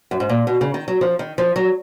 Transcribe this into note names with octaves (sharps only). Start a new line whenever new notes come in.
F#2
G#2
A#2
B2
C#3
D#3
F#3
F3
D#3
F3
F#3